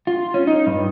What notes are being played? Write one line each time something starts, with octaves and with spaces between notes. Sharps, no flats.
F4
C#4
D#4
G2